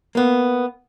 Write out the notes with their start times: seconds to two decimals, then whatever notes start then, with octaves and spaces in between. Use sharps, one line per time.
0.15 A#3 B3